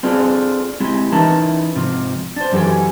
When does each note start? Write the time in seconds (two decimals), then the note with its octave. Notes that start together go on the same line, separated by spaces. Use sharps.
0.03 C4 D4 F4 G#4 A4
0.80 G#3 C4 E4 G4
1.12 E3 C#4 D#4 E4 A#4 A5
1.75 G#2 C3 F3
2.36 D4 C5
2.52 F#2 E3 G4 A4 G5 G#5